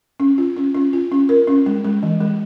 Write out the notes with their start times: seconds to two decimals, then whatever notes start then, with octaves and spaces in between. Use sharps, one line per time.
0.20 C#4
0.38 F4
0.57 C#4
0.75 C#4
0.93 F4
1.12 C#4
1.29 A#4
1.48 C#4
1.66 G#3
1.84 G#3
2.03 E3
2.21 G#3